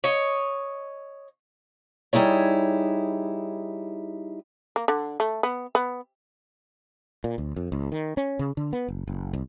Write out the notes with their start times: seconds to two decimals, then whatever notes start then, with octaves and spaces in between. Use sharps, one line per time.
0.04 C#5 D#5
2.13 G3 D#4 E4 G#4 C#5
4.76 A#3
4.88 D3
5.20 A3
5.43 B3
5.75 B3
7.24 A#2
7.38 D2
7.56 F2
7.72 C#2
7.92 D#3
8.17 C#4
8.39 C#3
8.57 D3
8.73 B3
8.89 F#1
9.08 F#1
9.33 C2